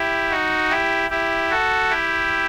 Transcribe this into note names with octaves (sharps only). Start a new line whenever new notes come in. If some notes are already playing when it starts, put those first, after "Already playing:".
Already playing: E4 G4
D#4 F#4
E4 G4
E4 G4
F#4 A4
E4 G4